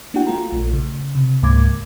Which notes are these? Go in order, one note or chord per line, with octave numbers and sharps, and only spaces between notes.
A#3 D4 E4 F#4 F#5 G5
A3 F4 A#5
A#1 A3
C#3
C3
C#2 G#2 A#3 D6 G#6